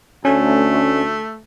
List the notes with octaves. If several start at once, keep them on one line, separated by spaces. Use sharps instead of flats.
D2 A3 C#4